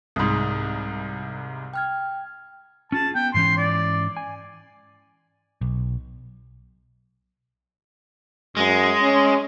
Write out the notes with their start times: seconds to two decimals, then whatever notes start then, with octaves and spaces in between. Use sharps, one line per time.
0.16 C2 G#2 B5 D#6
1.74 G5 F6 G#6
2.92 C#4 F4 G#4 A5
3.15 B3 G5
3.34 G#2 E3 C#4 C6
3.57 D5
4.17 G#5
5.61 B1
8.57 F#2 G#3
9.02 C#4